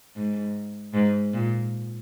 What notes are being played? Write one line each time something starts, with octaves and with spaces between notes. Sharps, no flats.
G#2
G#2
A#2